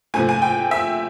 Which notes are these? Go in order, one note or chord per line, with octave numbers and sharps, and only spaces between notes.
C3 F3 A3 G#5
G#5
G5
E5